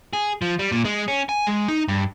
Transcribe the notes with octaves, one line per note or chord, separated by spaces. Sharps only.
G#4
F3
G3
A#2
G#3
C#4
G#5
G#3
D#4
G2